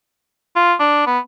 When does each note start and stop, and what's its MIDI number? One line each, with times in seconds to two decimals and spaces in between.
0.56 0.74 65
0.80 1.05 62
1.06 1.19 59